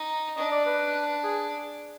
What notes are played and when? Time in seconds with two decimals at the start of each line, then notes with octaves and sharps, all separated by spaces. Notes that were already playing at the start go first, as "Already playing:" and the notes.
Already playing: D#4
0.37 D4 D#5
0.52 D5
0.66 B4
1.24 G#4